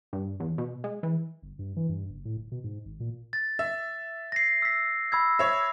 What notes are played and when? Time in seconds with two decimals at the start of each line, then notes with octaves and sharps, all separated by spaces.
0.13 G2
0.40 E2
0.58 B2
0.84 G#3
1.03 E3
1.43 G1
1.59 G2
1.76 E3
1.89 G2
2.09 F#1
2.25 A2
2.37 D1
2.52 B2
2.64 G#2
2.85 G#1
3.00 A#2
3.33 A6
3.59 E5
4.32 A#6 C7
4.62 E6 B6
5.12 B5 E6 G#6
5.39 C#5 E5